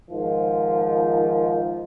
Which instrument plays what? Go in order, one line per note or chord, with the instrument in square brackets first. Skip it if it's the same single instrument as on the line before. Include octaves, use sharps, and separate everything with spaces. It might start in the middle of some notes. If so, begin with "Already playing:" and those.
[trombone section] G#2 D#3 F3